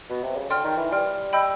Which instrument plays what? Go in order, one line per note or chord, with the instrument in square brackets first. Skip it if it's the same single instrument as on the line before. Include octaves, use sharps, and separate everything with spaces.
[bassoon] B2
C3
C#3
[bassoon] D3 [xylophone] D5 G5 C6 F6
[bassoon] D#3
E3
[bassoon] G3 [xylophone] D5 G5 C6 F6
[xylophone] D#5 G5 B5 E6 G6